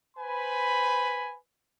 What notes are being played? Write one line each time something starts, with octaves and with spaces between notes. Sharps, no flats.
B4 C5 G#5 B5